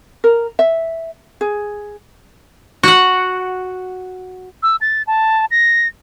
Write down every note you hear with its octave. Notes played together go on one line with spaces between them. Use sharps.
A#4
E5
G#4
F#4 F#5
E6
A6
A5
A#6